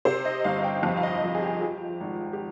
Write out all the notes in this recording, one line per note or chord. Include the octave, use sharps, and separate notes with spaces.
C3 C5
D#5
G1 F5
F5
G5
F2 F5
F5
D#5
F3
G#4
G4
F3
G#1
G4